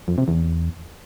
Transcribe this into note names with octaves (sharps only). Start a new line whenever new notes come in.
F2
C3
E2